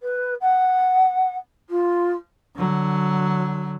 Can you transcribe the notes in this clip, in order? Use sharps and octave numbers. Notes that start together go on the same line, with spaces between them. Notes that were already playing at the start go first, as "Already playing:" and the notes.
B4
F#5
F4
D3 F#3